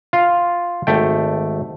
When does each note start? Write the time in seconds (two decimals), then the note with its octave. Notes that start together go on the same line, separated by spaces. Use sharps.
0.13 F4 F5
0.87 G#1 A3 G5